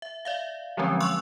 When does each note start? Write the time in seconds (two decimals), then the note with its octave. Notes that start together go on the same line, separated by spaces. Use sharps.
0.02 E5
0.25 D5 E5 F5
0.77 D3 F3 F#3 G#3 C4 C#4
1.00 C6 C#6 E6 F#6